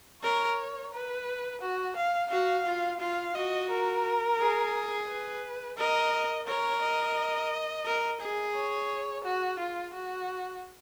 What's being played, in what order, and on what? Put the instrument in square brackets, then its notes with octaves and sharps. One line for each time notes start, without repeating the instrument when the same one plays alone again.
[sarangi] A#4 [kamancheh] C#5
[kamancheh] B4
F#4
F5
[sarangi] F#4 [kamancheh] F5
[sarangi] F4
[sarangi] F4 [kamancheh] F5
[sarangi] F#4 [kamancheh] D#5
[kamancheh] A#4
[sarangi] G#4
[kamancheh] B4
[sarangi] A#4 [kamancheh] D#5
[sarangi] A#4 [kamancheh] C#5
[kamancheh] D#5
[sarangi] A#4
G#4
[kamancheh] C#5
F#4
F4
F#4